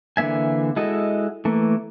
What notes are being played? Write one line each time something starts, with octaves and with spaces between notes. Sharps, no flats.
D3 E3 A#3 E5 G#5
G#3 E4 F#4 A4 D#5
E3 A3 A#3